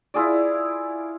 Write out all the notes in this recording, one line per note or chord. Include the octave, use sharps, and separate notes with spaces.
E4 F4 G#4 D5